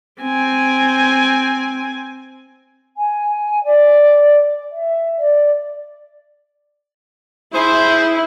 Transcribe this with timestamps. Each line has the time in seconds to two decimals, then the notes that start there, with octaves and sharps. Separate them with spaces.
0.21 C4 G#5
2.95 G#5
3.64 D5
4.71 E5
5.18 D5
7.54 E4 G#4 C5